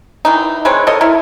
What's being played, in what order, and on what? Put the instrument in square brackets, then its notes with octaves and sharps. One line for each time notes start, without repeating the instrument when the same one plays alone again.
[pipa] D#3 E3 D#4
G#3 C4 B4 C#5
A4 A#4 C#5 D#5
D#4 E4 A#4